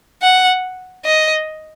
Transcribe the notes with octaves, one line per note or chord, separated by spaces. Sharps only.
F#5
D#5